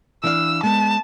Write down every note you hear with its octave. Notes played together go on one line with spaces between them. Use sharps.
E3 D4 F5 E6
G#3 B3 A5